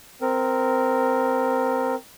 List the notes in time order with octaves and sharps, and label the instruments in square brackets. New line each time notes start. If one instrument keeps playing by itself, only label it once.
[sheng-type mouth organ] C4 A#4